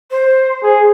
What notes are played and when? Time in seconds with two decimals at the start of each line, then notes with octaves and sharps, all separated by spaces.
0.11 C5
0.63 G#4